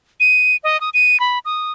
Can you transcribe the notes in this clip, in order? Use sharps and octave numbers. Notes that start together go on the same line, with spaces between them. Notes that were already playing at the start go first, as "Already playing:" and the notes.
D#7
D#5
D#6
D#7
B5
D#6